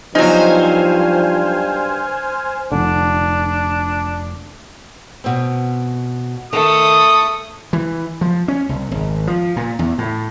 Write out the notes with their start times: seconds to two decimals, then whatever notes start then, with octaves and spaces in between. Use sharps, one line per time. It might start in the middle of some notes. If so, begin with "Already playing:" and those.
0.15 G2 F3 F#3 B3 D#4 C5 G#5 F6
2.72 F1 D3 D4
5.24 B2 C4
6.53 D#3 A3 D#6
7.73 E3
8.21 F3
8.48 C#4
8.69 C2
8.91 G#1
9.27 F3
9.56 A#2
9.79 E2
9.98 A2